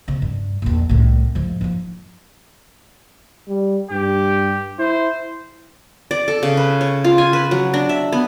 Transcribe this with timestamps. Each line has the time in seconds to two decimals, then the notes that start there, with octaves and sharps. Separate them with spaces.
0.08 C3
0.22 G2
0.62 A#1 E2
0.89 C2 A2
1.35 G#2 F3
1.61 F3 D#4
3.48 G3
3.91 G2 G4
4.79 E4 C5
6.11 D5
6.28 A4
6.43 C#3
6.57 B4
6.81 C#5
7.04 F4
7.18 G#5
7.33 B4
7.51 F#3
7.74 D4
7.89 E5
8.12 B3